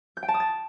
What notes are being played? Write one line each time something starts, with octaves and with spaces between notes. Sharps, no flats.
G6
G5
A5
D#6
A6